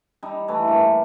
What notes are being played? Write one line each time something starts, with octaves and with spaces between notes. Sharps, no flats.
G3 D#4
E3 A3
G2 A#3